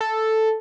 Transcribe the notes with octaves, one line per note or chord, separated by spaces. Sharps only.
A4